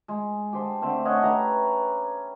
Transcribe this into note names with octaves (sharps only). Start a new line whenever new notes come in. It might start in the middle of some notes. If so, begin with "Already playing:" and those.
G#3
G4 C5 A5
D3 A3 C4
C#4 C#5 D#5 F#5
G4 B4 E5 A#5